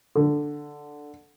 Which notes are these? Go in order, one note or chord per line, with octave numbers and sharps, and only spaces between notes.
D3